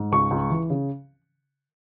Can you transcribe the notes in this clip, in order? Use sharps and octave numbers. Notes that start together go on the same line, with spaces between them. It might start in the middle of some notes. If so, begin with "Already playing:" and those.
Already playing: G#2
C#2 C#6
C#2
E3
C#3